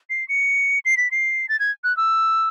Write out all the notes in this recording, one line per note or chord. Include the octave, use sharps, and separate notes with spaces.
C7
C#7
C7
B6
C7
A6
G#6
F#6
E6